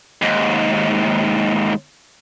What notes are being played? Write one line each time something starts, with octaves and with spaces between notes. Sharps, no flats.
D#2 G#2